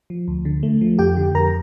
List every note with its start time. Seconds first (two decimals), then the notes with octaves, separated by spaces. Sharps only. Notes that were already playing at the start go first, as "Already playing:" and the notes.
0.10 F3
0.28 D2
0.45 D3
0.63 A3
0.81 F3
0.99 F2 G4 G5
1.17 D3
1.34 F2 A#4 A#5